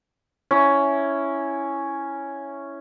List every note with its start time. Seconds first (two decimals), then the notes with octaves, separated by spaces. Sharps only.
0.51 C#4 E4